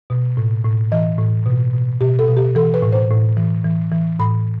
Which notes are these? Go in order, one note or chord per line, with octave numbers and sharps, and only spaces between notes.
B2
A2
A2
E3 D#5
A2
B2
B2
B2 G4
A4
B2
G4
E3 A4
B4
A2
C5
A2
E3
E3
E3
A2 B5